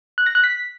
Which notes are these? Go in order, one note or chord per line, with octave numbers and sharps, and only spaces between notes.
F#6
A#6
F#6
B6